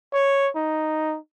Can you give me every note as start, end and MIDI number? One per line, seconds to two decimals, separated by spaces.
0.13 0.50 73
0.56 1.17 63